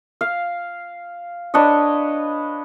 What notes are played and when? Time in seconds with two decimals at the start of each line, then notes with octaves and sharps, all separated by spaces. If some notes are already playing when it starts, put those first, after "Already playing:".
0.21 F5
1.54 D4 B4 C#5 D#5